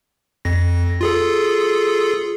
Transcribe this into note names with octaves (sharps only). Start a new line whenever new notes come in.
F2 A#6
F4 G#4 A4